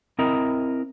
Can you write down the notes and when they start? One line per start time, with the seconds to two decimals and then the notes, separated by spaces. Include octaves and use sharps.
0.19 C4 E4 A#4 D#5 A#5